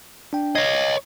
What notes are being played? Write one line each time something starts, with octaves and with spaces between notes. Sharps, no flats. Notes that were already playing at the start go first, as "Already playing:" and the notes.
D4 G5
C#5 D#5 G#6 A#6 C7